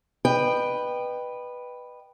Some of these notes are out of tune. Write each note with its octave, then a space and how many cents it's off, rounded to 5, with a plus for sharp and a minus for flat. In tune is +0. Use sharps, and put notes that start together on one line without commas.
B4 +0 D#5 -30 G5 +0